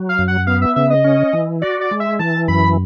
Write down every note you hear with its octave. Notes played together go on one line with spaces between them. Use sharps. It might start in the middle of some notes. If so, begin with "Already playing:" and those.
Already playing: F#3
F5
F#2
F#5
B3 F5
E5
C#3 E5
D#5
C#4
E3
F#4 D5
D5
G#3
E5
E3 A5
F#2 B5